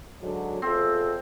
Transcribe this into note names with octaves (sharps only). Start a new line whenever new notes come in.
G#2 D3 F#3
E2 C4 F4 A4